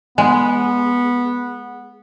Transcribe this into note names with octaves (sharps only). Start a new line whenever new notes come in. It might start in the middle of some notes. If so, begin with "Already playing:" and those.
G#3 B3